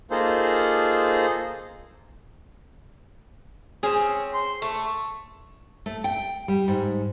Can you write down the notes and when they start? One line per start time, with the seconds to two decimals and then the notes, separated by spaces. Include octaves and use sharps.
0.11 A#3 D#4 F4 G#4 A4 C5
3.83 C4 C#4 G#4
4.34 C6
4.62 A3 C#6
5.86 A3
6.04 G5
6.48 G3
6.68 G#2